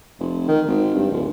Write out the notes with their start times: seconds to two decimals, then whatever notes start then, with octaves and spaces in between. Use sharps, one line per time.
0.20 F1
0.48 D#3
0.67 G#1
0.95 G2
1.11 D1